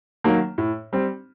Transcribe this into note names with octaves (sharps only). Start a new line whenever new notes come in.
D#3 F#3 A#3
A2
G3 C4